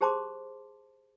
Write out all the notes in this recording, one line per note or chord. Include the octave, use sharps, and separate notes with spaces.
G4 G#4 C5 A5 C6 D6